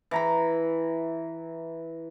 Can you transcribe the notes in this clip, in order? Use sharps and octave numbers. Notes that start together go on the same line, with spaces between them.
E3 A#5 B5